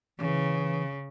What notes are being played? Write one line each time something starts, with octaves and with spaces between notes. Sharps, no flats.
C#3 E3